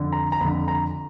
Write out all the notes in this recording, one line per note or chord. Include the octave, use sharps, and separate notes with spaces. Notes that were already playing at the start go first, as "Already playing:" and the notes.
Already playing: F2 D3
A#5
A#5
F2 D3 B5
A#5